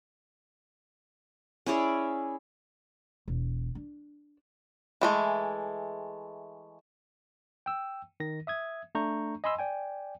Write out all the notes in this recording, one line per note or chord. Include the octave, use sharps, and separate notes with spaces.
C#4 E4 G#4 D5
E1
D4
E3 G#3 A3
G5 E6
D#3 A#6
E5 D#6 G#6
A3 D4 A#5 C#6 G6
D#5 G#5 B5 C6 E6
D5 G5 G#5